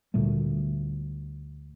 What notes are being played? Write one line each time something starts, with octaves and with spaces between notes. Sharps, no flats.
D2 A#2 G3 A3